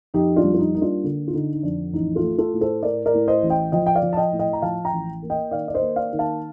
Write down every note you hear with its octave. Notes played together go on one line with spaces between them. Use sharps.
F2 D#4 G4
D4 F4
G3
F4
D#4
A#3 D#4
D4 F4
D3
F4
D3 D#4
D#4
F2 D4
A1 D#4
F4 A4
A3
F4 A4
A2
A4 C5
A2 A#4 D5
A#4 D5
A2
C5 D#5
A1
D#5 G5
F3 D#5 G5
G5
D5 F5
F3
A5
D#5 G5
A2
D#5 G5
A#5
F3 F5 A5
G5 A#5
A1
A#3
D#5 G5
D#3 D5 F5
D5
C5 D#5
A#3
D5 F5
D#3
F5 A5